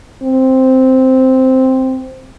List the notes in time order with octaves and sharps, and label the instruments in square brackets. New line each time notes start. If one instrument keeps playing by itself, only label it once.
[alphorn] C4